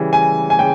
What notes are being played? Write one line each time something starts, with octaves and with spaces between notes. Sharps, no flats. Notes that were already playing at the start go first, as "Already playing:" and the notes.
Already playing: C#3 E3 G3
G#5
G#5
C#3 G5